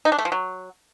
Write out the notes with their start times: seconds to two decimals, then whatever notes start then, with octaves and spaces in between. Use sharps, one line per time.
0.05 D#4
0.12 D4
0.18 A3
0.25 F3
0.32 F#3